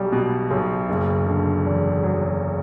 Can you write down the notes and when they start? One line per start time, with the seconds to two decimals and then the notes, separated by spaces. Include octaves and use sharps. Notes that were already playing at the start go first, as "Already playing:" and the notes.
Already playing: B1 G3
0.12 B2
0.51 B1
0.89 F#1
1.26 D3
1.65 E2
2.03 F#3